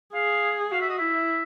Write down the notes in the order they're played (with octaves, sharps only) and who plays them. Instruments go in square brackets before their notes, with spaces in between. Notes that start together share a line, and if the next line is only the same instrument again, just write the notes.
[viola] G#4 [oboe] F5
[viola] F#4 [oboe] F5
[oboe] E5
D#5
[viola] E4 [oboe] E5